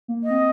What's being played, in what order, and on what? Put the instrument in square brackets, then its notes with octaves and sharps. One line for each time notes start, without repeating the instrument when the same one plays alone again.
[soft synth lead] A#3
[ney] D#5
[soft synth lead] C4